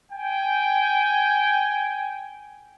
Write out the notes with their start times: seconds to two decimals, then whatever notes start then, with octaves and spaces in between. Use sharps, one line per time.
0.12 G5 G#5